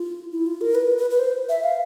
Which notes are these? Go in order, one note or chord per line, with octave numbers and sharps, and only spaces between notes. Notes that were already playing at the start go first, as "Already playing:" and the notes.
Already playing: F4
E4
F4
A#4
B4
B4
B4
C5
E5
F5